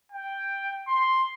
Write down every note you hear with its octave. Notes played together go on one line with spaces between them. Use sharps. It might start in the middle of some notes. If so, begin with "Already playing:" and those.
G5
C6